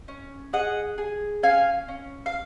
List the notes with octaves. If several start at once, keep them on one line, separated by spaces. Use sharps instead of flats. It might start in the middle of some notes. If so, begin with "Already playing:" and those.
C#4
G#4 D#5 F#5
G#4
C#4 F5 G#5
C#4
F5